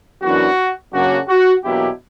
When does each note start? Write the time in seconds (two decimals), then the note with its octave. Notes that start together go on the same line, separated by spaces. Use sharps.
0.22 F#2 E3 B3 D4 F#4
0.92 F#2 C#3 F#3 A#3 D4 F#4
1.27 F#4
1.62 E2 B2 F#3 A#3 D4 E4 G4